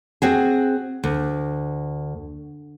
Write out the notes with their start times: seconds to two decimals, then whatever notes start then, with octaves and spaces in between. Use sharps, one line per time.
0.22 C4 F#4 G#4
1.04 D2